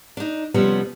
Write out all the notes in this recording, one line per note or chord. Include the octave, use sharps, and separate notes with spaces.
D4 D#4
F2 C3 F3 G3 B3 C#4